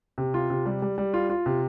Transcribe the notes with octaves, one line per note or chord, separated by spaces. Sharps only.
C3
F4
C3
G3
G3
G3
F4
F4
C3